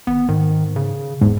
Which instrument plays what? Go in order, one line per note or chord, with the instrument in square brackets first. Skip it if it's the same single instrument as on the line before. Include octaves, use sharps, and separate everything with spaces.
[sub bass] G#1 [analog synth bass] B3
[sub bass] G#2 [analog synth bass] D#3
[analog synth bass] C#3
[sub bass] F#1 [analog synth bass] E2 [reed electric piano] G#2